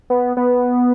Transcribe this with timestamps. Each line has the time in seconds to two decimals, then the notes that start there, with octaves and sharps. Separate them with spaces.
0.10 B3
0.37 B3